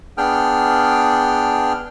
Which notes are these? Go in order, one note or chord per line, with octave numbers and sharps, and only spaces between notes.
B3 D4 G#4 G5 F6